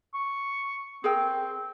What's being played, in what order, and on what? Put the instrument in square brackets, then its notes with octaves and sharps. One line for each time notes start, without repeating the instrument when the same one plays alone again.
[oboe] C#6
[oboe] C4 [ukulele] G#4 A#4 G5